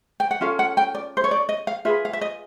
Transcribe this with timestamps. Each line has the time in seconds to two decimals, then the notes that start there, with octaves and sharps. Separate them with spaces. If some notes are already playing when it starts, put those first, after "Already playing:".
0.20 G5
0.31 F#5
0.41 C#4 F4 A4 F5
0.59 F#5
0.77 G5
0.95 D5
1.17 C5
1.24 C#5
1.31 D5
1.49 D#5
1.67 F5
1.85 F4 G#4 B4 E5
2.05 F5
2.13 E5
2.21 D#5